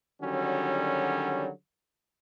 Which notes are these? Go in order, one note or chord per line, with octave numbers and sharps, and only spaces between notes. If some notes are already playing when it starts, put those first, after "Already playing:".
D3 D#3 F#3 G3 C#4 F#4